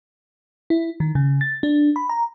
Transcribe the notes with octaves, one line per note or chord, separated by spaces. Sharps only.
E4
D#3
C#3
A6
D4
B5
A#5